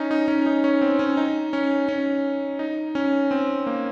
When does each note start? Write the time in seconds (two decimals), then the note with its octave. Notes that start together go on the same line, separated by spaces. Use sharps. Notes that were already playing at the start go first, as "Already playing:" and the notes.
Already playing: C#4 D#4
0.11 D#4
0.28 C#4
0.46 D#4
0.64 C#4
0.81 C4
0.99 C#4
1.17 D#4
1.53 C#4
1.89 C#4
2.59 D#4
2.95 C#4
3.31 C4
3.67 A#3